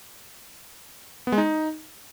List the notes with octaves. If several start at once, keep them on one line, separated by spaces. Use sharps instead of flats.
B3
G#3
D#4